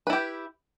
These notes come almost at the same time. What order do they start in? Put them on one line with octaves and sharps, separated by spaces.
B4 E4 G4